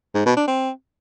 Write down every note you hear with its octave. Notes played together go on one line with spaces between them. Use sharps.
G#2
B2
D4
C4